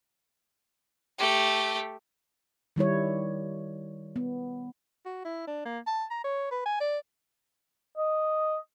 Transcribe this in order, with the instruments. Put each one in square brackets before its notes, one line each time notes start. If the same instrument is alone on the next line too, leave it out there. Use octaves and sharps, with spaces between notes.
[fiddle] A3 G4
[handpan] D#3 G3 E4 C#5
B3
[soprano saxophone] F#4
E4
D4
A#3
A5
A#5
C#5
B4
G#5
D5
[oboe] D#5